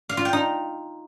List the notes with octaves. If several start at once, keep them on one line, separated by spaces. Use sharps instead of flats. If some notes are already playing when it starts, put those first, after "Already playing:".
F5
F4
G5
D#4